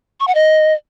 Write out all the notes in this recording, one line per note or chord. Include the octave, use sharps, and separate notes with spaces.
C#6
F#5
D#5